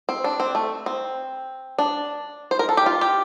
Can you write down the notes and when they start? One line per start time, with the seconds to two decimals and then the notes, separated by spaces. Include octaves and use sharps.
0.09 C4
0.24 D4
0.40 C4
0.55 A3
0.86 C4
1.79 D4
2.51 C5
2.59 A#4
2.69 A4
2.77 G4
2.86 F4
3.01 G4